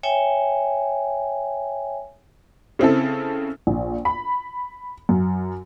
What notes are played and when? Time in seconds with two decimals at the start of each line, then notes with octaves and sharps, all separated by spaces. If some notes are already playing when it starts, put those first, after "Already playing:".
0.03 C#5 E5 G5 G#5
2.79 C#3 C4 E4 A4
3.67 A#1
4.05 B5
5.09 F#2